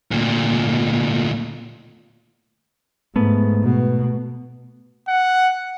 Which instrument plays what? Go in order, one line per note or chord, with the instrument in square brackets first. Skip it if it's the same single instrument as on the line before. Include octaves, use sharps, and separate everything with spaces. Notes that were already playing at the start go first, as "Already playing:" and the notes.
[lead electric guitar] D2 A#2
[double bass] G#2 [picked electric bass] A3 B3
[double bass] B2
[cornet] F#5